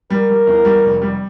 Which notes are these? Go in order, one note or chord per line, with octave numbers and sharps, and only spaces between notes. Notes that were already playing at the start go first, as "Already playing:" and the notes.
G3 A#4
G3
E2
G3
F1
G3